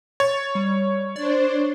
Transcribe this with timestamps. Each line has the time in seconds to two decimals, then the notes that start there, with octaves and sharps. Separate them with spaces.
0.20 C#5 A6
0.55 G3
1.16 D4 C5 D5